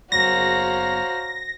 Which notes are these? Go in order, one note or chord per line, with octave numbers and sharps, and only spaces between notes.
F#1 B3 F#4 C5 C#5 F5 A#5 A#6